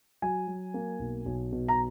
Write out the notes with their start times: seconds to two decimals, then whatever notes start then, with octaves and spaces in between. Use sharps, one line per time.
0.22 F#3 G#5
0.47 F#3
0.74 A#3
0.99 B1
1.25 B1
1.52 B2
1.68 A#5